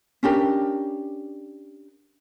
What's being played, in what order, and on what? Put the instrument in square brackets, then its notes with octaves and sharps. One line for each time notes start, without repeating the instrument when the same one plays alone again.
[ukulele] C#4 D4 G4 A#4